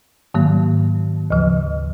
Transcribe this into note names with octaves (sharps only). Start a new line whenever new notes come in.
G#2 D#3 F#3 A#3
D2 C#3 F3